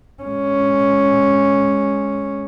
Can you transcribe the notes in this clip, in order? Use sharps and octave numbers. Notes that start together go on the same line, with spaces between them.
G#3 C#4